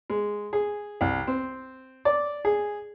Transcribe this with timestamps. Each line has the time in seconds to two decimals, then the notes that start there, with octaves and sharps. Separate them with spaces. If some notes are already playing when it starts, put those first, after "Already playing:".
0.10 G#3
0.53 G#4
1.01 C2
1.27 C4
2.05 D5
2.45 G#4